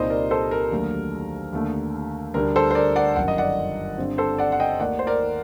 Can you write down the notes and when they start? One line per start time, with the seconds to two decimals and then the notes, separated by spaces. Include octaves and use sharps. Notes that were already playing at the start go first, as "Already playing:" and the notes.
Already playing: C2 A#2 G3 C4 D#4 C5 D#5
0.10 A#4 D5
0.31 A4 C5
0.51 A#4
0.71 D#2 D3 F#3 A3
1.53 D#2 D3 A3
2.34 D2 D3 G3 D4 A#4
2.56 A4 C5
2.71 C5
2.75 A#4 D5
2.96 D5 F#5
3.16 G1 F#2 D#3 F#5
3.28 D#5
3.38 D5 F#5
3.98 G2 D3 G3 C4
4.18 A4 C5
4.38 D5 F#5
4.52 F#5
4.60 D#5 G5
4.79 D#2 D#3 A3 D5 F#5
4.99 C5
5.07 A#4 D5